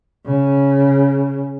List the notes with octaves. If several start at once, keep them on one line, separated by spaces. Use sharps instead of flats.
C#3